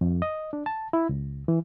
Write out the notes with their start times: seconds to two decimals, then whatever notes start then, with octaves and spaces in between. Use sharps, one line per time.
0.01 F2
0.22 D#5
0.53 D4
0.66 A5
0.93 E4
1.09 C#2
1.48 E3